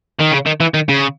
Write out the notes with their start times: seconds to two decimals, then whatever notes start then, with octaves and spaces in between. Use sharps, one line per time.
0.21 D#3
0.32 C#3
0.46 D#3
0.60 E3
0.74 D#3
0.89 C#3